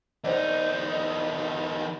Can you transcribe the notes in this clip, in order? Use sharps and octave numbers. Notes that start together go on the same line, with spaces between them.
E2 D#4 C5 D5 D#5